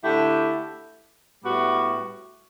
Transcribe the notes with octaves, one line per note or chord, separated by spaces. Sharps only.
D3 A3 E4 G4
A2 G3 B3 F#4